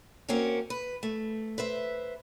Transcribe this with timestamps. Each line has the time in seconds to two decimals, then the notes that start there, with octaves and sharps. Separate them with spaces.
0.29 A#3 C4 C#4 F#4 A#4
0.70 B4
1.03 A3
1.58 B4 C5 E5